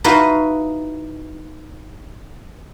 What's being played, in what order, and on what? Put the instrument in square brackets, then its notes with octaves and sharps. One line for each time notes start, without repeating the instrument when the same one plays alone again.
[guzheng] D#4 E4 F#4 B4 D#5 F5